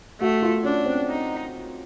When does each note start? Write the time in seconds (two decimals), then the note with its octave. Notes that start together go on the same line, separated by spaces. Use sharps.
0.21 A3 F#4
0.42 F4
0.64 C#4 D4
0.86 C4
1.07 D#4